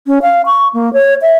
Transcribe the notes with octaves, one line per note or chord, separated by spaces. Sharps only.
C#4
F5
C#6
A#3
C#5
E5